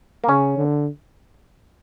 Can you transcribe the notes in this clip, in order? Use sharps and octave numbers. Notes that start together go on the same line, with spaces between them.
A#3
C#3 C#4
D3